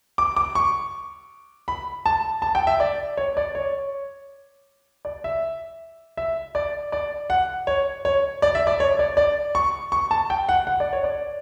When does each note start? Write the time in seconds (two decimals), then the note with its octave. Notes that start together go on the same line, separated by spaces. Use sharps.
0.18 D6
0.37 D6
0.55 C#6
1.68 B5
2.06 A5
2.42 A5
2.55 G5
2.67 E5
2.80 D5
3.17 C#5
3.37 D5
3.55 C#5
5.05 D5
5.24 E5
6.17 E5
6.55 D5
6.92 D5
7.30 F#5
7.67 C#5
8.05 C#5
8.42 D5
8.55 E5
8.67 D5
8.80 C#5
8.99 D5
9.17 D5
9.55 C#6
9.92 C#6
10.11 A5
10.30 G5
10.49 F#5
10.67 F#5
10.80 D5
10.93 C#5
11.04 D5